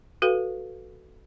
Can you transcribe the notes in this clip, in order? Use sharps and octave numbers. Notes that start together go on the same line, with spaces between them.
F#4 A4 B4 F5